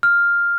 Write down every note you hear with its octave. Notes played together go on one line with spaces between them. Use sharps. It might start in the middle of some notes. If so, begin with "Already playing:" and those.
F6